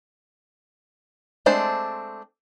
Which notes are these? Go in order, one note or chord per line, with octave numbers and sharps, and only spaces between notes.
G#3 A3 C4 D4 C5